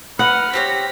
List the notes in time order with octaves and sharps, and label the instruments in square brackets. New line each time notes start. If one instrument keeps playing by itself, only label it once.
[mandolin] D#4 B5 D#6 [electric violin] B4 F6 [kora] F#5
[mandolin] C4 G4 C#5 [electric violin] A#6 B6